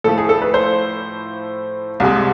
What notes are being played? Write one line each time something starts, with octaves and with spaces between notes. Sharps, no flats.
A2 F3 A3 A4
G#4
A4
B4
C5
C2 C3 G#3